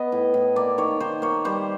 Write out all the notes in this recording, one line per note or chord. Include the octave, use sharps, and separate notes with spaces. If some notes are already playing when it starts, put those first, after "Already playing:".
Already playing: B3 D#5
A2
A2
A#3 D5
D#3 C#5
D#3 C5
A#3 C#5
G3 C5